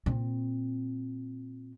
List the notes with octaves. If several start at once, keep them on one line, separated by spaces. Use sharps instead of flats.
A#2 C4